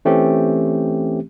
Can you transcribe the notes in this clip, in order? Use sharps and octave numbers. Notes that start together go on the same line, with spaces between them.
E3 A3 C4 C#4 G4